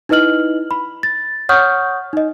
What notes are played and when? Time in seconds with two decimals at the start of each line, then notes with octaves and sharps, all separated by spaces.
0.09 D#4 E4 B4 D#5 F6 F#7
0.71 B5
1.03 A6
1.49 C#5 F#5 C#6 D#6 F6 G6
2.13 D#4 D#5